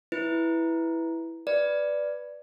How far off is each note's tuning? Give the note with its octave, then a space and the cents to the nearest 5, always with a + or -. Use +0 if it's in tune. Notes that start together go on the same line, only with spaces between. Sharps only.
E4 +0 B4 +0
B4 +0 D5 +0